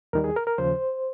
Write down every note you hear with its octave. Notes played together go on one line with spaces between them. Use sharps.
D#2 D#3 G3 A#4
G#4
A#4
A#4
D#2 C#3 F3 C5